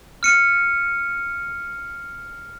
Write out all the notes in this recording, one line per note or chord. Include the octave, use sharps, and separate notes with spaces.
F6 C#7 D#7